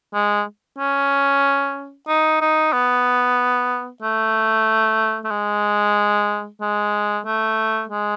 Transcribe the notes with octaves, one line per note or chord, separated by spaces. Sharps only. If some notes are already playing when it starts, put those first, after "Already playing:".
G#3
C#4
D#4
D#4
B3
A3
A3
G#3
G#3
A3
G#3